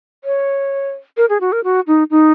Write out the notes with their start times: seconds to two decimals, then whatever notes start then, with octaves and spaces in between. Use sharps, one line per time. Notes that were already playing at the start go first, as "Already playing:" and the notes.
0.24 C#5
1.17 A#4
1.29 G#4
1.41 F#4
1.52 A#4
1.64 F#4
1.87 D#4
2.11 D#4